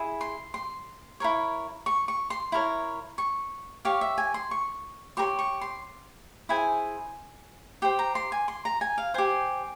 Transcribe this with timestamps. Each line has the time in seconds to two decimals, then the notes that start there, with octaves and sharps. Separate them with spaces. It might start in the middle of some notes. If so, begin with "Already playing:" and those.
Already playing: E4 G#4
0.21 C6
0.54 C6
1.20 E4 A#4 C#5
1.86 C#6
2.08 C#6
2.30 C6
2.52 E4 A#4 C#5
3.18 C#6
3.85 G4 C#5 F5
4.01 E5
4.18 G#5
4.34 C6
4.51 C#6
5.17 G4 A#4 C6
5.22 C#5
5.39 C#6
5.61 C6
6.49 E4 G#4 C5 G#5
7.82 G4 C5 G5
7.99 A#5
8.15 C6
8.32 G#5
8.48 C6
8.65 A#5
8.81 G#5
8.98 F5
9.14 G4 C5 G#5